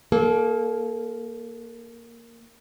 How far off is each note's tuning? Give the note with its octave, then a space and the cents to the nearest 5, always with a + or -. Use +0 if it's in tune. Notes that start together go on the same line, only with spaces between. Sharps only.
A#3 +0 A4 -35